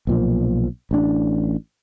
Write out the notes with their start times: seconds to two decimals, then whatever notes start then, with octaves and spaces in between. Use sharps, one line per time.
0.07 B1 A#2 F3
0.91 A1 D4